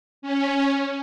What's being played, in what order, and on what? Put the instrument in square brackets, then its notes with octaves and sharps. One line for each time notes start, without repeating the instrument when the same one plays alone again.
[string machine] C#4